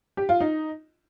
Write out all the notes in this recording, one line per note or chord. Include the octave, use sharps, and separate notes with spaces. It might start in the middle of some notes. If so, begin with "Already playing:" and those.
G4
F4
D#4